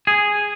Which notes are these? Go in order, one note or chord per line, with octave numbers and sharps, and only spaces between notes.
G#4